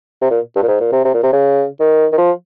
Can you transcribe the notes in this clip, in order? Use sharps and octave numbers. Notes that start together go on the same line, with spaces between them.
C3
A#2
G2
A#2
G#2
A#2
C3
C3
A#2
C3
C#3
D#3
D#3
F3